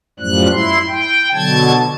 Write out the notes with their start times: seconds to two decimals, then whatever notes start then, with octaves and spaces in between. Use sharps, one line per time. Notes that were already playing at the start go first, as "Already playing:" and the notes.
0.20 F#2 A2 F3 G3 F#6
0.52 E4 C6
0.88 G5
1.34 B2 D3 F#3 A5 G#6